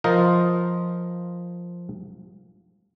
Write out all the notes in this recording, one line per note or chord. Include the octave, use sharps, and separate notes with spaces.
F3 F4 A#4 C5 D#5